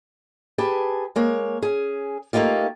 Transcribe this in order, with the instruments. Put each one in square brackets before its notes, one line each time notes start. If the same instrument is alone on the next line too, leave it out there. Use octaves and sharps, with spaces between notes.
[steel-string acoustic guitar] G4 G#4 B4 G#5 A5
G#3 A#3 C#5
C#4 G#4
A3 A#3 C#4 D#4 F4 G4